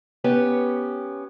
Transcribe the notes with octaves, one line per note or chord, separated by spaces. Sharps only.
B3 C#4 G4